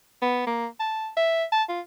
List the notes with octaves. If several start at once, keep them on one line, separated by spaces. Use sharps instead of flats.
B3
A#3
A5
E5
A5
F4